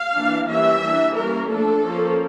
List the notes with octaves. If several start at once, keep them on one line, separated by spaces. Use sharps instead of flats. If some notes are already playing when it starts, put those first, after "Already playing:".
Already playing: F5
E3 A#3 D4
E3 G3 A#3 C#4 E5
E3 A#3 D4
G3 A#3 C#4 A#4
F3 A3 D4 A4
F3 A#3 C#4